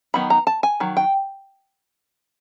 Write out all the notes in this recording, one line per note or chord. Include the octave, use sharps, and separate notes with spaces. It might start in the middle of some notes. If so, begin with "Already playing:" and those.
D#3 F#3 B3 D#4 B5
A#5
A5
G#5
D#3 F#3
G5